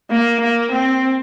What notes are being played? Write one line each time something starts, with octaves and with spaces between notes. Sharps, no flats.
A#3
A#3
C4